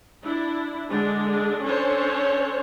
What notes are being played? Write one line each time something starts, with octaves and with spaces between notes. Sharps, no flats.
D4 E4
D3 G#3 D4
C#4 D4 A4 C5 C#5